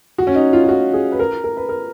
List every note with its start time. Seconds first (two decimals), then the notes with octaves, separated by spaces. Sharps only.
0.18 F#4
0.27 C#4
0.35 D#4
0.53 F4
0.64 F4
0.68 F#4
0.93 G#4
1.12 B4
1.19 A#4
1.44 A#4
1.57 B4
1.69 A#4